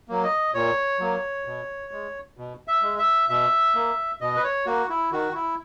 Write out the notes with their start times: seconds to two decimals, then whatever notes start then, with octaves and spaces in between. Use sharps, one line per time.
0.09 F#3 A#3
0.24 D#5
0.54 A#2 C#5
1.00 F#3 A#3
1.45 B2
1.91 G#3
2.37 B2
2.68 E5
2.82 G#3
2.99 E5
3.29 B2 E5
3.75 A#3
4.21 B2 D#5
4.36 B4
4.44 C#5
4.66 A#3 F#4
4.89 E4
5.12 D#3 F#4
5.34 E4